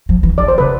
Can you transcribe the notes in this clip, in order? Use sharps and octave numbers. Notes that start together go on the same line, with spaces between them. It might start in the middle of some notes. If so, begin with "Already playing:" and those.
F3
E3
E3 D5
C5
C#3 B4